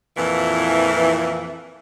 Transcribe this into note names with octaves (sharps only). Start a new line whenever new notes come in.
F2 A#2 E3